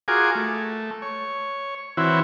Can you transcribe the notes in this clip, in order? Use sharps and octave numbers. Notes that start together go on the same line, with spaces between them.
F4 F#4 G#4 A#4 G#5 D6
A3
C#5
E3 C4 E4 F#4 C#5